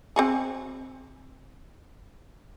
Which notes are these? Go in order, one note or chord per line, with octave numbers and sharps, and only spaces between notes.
C4 F#4 G#4